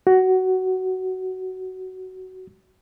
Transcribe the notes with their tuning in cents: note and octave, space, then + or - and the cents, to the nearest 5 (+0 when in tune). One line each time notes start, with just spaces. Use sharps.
F#4 +15